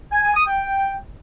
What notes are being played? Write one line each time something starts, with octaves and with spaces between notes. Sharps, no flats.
G#5
G#5
D#6
G5